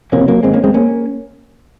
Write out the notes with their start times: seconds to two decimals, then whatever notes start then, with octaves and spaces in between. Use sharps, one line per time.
0.12 F#1 F2 C3 A#3 C#4
0.28 F#3 A#3
0.43 G#1 G#2 G#3 C4
0.53 A#3 C#4
0.64 G#3 C4
0.74 A#3 C#4